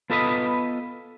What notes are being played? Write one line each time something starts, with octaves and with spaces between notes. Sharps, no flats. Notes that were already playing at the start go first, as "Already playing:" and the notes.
B3 F4 A4 B4 D#5 B5